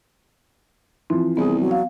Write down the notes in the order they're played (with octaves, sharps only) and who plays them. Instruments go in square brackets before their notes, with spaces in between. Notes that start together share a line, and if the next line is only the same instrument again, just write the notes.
[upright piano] E3 F3 [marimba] C4
[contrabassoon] C2 [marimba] B3 [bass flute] G#4
[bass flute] F#3
[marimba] F5